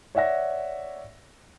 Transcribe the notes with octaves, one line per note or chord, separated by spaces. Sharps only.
C#5 D5 E5 F#5 A#6